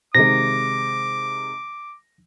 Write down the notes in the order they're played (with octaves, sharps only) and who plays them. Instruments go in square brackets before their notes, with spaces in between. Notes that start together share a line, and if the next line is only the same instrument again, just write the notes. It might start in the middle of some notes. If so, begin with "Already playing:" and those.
[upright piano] C3 D#3 G#3 [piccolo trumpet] D6 [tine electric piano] A#6